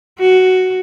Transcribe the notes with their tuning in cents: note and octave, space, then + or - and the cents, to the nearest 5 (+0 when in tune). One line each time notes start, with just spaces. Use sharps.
F#4 +5